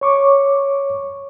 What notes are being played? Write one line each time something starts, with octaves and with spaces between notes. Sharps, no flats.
C#5 C#6 D6